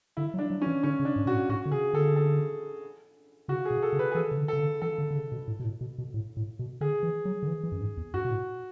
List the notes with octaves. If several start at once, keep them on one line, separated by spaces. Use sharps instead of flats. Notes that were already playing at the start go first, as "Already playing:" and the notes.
D3 E4
F#3
D4
F#3
C#4
E3
D3 C#4
C#3
D4
G#2
B2 F#4
A2
A2 F#4
D3
C#3 G#4
D3 A4
A4
C#3 F#4
G#4
B2
A4
C#3
B4
G#4
E3 A4
C#3
D3
C#3 A4
D3
E3 A4
D3
D3
C#3
B2
A2
B2
A2
B2
B2
A2
A2
B2
D3 G#4
E3
F#3
D3
E3
E3
F#2
G#2
E2
F#2 F#4
B2
A2